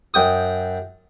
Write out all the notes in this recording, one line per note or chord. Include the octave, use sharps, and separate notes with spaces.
F#2 G5 D#6